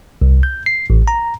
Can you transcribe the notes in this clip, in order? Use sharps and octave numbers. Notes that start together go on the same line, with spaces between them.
C2
G6
C7
A1
A#5